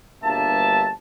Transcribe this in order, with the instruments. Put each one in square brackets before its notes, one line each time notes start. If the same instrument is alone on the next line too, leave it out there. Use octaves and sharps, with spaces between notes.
[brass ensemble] G1 G2 B2 A#3 E5 A5